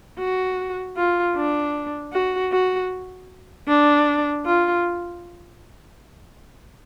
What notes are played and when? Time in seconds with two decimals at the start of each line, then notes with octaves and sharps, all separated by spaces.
0.19 F#4
0.96 F4
1.36 D4
2.13 F#4
2.52 F#4
3.68 D4
4.46 F4